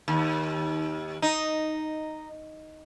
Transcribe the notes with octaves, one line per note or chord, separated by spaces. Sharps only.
D#2
D#4